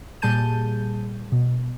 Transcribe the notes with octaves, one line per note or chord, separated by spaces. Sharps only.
A#2 G3 G#4 A5 G6 D#7
B2